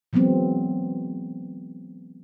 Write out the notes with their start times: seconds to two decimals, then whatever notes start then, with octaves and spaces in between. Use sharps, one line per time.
0.13 E3 F#3 G#3 B3 C4